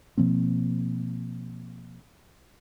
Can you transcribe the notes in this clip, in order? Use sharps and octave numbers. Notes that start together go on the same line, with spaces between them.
B2 F3 A#3 C4